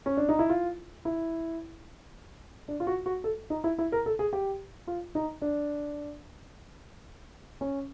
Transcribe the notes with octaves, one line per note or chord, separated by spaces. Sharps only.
C#4
D4
D#4
E4
F4
E4
D4
F4
F#4
F#4
A4
D#4
E4
E4
A#4
A4
G#4
G4
F4
D#4
D4
C#4